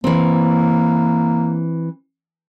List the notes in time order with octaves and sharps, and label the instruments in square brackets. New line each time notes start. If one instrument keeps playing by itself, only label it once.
[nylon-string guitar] E3 C4 [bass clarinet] A#3